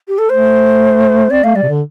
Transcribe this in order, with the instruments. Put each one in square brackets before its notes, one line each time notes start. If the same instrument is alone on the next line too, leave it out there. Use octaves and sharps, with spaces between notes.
[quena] G4
A4
[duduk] A3 [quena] C5
[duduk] C4 [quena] D5
[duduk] A3 [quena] F5
[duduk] G3 [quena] D5
[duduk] C3
D3